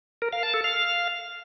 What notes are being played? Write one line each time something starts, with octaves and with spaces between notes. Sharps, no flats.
A#4
F5
A5
A4
F5